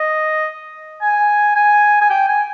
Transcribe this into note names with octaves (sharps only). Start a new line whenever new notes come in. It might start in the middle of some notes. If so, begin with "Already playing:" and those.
Already playing: D#5
G#5
G#5
G#5
G5
G#5